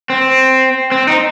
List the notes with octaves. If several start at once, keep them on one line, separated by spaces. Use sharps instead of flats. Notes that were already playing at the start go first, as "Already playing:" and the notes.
C4
C4
D#4